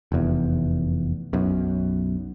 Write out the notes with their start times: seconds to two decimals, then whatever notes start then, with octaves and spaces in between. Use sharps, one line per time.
0.12 F1 E2
1.33 B1 F#2